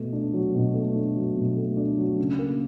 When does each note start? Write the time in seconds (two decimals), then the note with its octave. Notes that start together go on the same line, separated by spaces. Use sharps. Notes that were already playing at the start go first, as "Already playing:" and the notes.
Already playing: B2 A3
0.13 D4
0.34 F#3
0.55 B2
0.74 A3
0.96 D4
1.16 F#3
1.36 B2
1.57 A3
1.77 D4
1.98 F#3
2.18 C#3
2.39 A#3